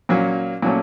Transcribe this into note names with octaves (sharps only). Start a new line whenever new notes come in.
A#2 F#3 A#3 C#4
A#2 F#3 A3 C#4